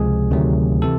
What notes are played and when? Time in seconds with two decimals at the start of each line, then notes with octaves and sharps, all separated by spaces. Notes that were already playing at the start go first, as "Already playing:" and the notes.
Already playing: C#2 C3 F3 G#3 G#4
0.31 D2 C3 D#3 F#3 A3
0.82 C3 E3 A4